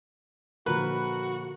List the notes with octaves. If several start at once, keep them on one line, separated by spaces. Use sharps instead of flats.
A#2 D3 F3 F#4 A#4 B4